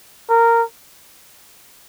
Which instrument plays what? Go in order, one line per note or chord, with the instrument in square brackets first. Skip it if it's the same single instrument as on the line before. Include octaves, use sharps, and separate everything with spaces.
[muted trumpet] A#4